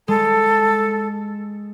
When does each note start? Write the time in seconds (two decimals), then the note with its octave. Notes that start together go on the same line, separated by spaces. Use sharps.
0.08 G#3 A4